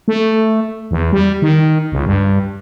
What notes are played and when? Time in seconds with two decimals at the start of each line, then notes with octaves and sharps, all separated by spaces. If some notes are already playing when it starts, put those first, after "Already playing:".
0.08 A3
0.91 E2
1.12 G3
1.42 D#3
1.92 C#2
2.06 G2